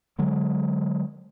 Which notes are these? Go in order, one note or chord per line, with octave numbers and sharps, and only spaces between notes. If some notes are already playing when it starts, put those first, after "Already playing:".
D3 F#3 G#3